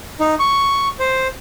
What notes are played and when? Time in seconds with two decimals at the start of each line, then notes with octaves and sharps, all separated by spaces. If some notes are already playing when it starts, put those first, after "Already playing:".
0.20 D#4
0.39 C#6
0.99 C5